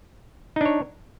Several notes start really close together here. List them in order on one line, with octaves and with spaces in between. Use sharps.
D#4 D4 C#5